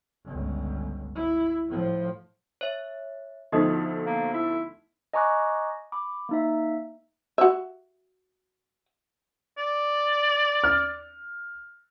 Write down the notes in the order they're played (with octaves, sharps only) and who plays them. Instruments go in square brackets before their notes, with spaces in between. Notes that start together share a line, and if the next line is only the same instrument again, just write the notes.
[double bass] G1 C#2
E4
A2 F3
[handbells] C#5 E5
[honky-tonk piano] D2 F3 A3 [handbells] B3 [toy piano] D#4 D#5 D#6
[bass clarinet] A#3
E4
[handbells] D#5 G#5 A#5 C#6 D6 F#6
B5 D6
A#3 D#4 E5
[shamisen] F#4 E5
[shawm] D5
[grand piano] F6